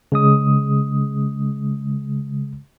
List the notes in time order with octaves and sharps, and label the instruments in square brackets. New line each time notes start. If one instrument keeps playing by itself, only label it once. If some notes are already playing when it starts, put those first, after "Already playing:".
[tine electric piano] C#3 G#3 D#6